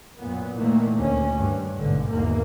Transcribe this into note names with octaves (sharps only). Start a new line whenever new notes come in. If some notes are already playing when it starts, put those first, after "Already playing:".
F#2 A#2 B3
A#2 D#3 E3 A3 A#3
D2 D#3 C#4
G2
A1 G#2 B2 D3
G#1 E2 G#2 A#3